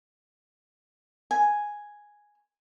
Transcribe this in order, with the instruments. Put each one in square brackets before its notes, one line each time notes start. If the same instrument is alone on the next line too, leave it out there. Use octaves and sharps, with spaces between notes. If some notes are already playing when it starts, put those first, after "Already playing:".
[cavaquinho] G#5